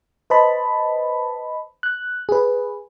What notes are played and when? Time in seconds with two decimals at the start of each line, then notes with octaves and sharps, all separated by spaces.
0.30 B4 C5 D#5 A5 B5
1.83 F#6
2.29 G#4 B4